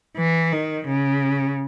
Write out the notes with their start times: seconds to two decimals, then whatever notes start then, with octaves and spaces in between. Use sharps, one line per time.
0.17 E3
0.52 D#3
0.88 C#3